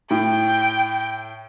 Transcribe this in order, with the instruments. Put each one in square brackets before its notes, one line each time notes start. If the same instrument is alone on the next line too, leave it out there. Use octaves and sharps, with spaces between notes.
[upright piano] A2 [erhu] G5